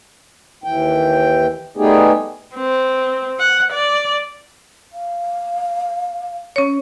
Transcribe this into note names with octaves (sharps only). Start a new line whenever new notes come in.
D#2 E3 G5
G3 A3 B3 D#4 G4 G#4
C4
F#5
D5
F5
C#4 C#5